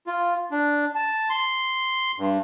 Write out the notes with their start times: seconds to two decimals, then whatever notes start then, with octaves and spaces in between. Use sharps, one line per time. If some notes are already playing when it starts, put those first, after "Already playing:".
0.07 F4
0.51 D4
0.95 A5
1.30 C6
2.18 G2